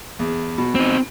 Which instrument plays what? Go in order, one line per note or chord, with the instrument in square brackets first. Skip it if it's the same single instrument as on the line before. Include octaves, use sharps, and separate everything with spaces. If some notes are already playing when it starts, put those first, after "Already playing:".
[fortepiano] E2
B2
[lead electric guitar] C4 D#4